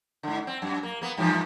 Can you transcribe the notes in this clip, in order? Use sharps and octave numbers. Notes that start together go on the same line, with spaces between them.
G#2 D3
C4
F#2
A#3
A#3 B3
G2 E3 F3